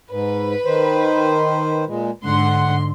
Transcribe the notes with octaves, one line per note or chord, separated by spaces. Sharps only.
G#2 B4
D#3 C5
A#2 G#3
G#2 D3 F#5 C6